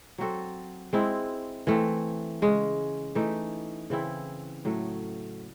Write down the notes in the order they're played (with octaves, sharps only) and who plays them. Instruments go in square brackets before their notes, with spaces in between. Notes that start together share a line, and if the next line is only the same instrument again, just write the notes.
[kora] F#3 C4 F#4 A4
G#3 C4 E4
E3 A3 C4
C#3 G#3 C#4
E3 A3 D#4
C#3 E3 C4 E4
A2 F#3 A3